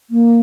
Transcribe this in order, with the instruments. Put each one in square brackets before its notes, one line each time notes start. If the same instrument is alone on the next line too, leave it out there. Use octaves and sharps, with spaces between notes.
[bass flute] A#3